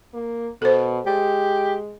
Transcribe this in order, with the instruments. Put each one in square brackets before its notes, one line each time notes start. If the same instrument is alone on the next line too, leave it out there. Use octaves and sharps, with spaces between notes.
[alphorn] A#3
[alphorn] B2 [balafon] A4 C5
[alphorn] G#3 [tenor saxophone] G4